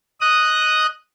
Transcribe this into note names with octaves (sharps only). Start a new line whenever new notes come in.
D#5 D#6 F#6